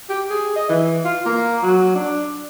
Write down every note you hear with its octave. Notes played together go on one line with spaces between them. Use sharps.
G4
G#4
D#5
E3
F4
A#3
F#3
D4